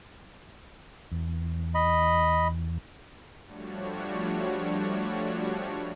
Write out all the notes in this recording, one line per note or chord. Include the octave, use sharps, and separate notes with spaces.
E2
D#5 B5
F3 G3 A3 D4 F#4 C#5